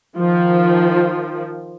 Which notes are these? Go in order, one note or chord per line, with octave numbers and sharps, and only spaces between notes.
D#3 F3